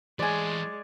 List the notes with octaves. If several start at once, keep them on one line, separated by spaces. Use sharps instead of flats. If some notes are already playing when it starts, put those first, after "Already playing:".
E3 G#3 C#5 D5 G#5